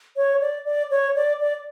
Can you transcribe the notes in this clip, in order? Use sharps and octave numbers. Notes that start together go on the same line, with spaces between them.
C#5
D5
D5
C#5
D5
D5